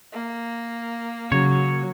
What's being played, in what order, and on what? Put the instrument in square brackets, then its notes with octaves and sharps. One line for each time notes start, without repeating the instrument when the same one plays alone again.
[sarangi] A#3
[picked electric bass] C#3 [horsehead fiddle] F#3 [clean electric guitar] C#5